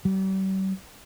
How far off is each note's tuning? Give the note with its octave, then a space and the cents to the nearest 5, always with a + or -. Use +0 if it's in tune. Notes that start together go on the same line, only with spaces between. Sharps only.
G3 -45